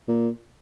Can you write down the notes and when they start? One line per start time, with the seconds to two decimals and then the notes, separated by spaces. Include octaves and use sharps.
0.08 A#2